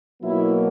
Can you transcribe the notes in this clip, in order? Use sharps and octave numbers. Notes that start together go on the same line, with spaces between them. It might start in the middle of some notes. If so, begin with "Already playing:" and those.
B2 F#3 A#3 E4